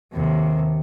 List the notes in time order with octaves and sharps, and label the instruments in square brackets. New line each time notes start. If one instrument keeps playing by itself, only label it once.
[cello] D#2 C3